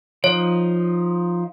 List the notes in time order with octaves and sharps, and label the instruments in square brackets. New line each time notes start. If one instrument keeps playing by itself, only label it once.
[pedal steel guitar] F3 D#4 [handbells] C#5